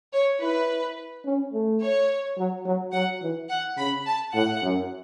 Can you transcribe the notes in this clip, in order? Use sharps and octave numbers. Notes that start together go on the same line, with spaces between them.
C#5
E4 B4
C#4
A3
C#5
F#3
F#3
F#3 F#5
E3
F#5
C#3 B5
A5
A2 F#5
F#2